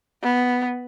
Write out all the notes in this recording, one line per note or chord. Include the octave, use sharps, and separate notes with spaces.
B3